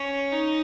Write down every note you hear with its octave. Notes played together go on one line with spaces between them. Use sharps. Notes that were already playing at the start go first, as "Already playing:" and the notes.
Already playing: C#4
D#4